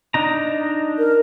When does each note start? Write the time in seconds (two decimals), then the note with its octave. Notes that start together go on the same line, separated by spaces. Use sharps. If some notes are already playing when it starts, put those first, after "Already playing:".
0.14 D4 D#4 A#5
0.99 A#4